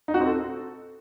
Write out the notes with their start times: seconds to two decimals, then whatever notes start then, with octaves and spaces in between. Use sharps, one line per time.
0.08 D#4
0.14 F#4
0.20 C4
0.26 A4